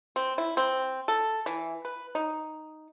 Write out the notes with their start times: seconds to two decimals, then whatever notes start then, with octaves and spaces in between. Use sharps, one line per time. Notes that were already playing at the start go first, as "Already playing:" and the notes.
0.16 C4
0.38 E4
0.57 C4
1.08 A4
1.46 E3
1.85 B4
2.15 D#4